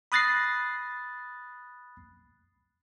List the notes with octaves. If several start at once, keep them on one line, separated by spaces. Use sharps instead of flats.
B5 D#6 F#6 A6 A#6 C7